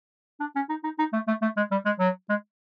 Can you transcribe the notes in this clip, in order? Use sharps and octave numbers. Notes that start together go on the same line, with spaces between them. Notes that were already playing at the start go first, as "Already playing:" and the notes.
D4
C#4
D#4
D#4
D#4
A3
A3
A3
G#3
G3
G#3
F#3
G#3